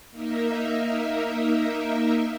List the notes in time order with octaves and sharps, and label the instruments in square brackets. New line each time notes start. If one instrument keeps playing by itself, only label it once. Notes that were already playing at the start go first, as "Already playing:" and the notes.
[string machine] A#3 D#4 A#4 E5